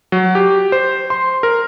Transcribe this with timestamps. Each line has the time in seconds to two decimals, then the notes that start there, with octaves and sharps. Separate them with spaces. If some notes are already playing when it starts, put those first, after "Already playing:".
0.12 F#3
0.35 G4
0.72 C5
1.10 C6
1.43 A#4